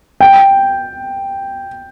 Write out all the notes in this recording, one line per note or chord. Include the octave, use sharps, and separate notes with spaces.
G5